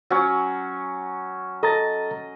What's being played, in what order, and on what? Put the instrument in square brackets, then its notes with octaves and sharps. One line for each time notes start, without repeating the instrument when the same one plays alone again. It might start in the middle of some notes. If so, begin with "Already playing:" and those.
[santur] F#3 C#4
[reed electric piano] A4 A#5 A6 [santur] D#5